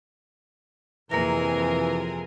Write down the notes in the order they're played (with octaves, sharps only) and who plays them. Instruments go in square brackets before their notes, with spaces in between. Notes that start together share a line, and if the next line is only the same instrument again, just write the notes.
[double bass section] F2 [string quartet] C3 G#4 A#4 [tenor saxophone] E3 [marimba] A#3 A#5 A#6